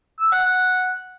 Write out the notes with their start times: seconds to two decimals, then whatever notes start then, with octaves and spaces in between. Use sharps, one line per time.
0.20 E6
0.32 F#5
0.44 F#5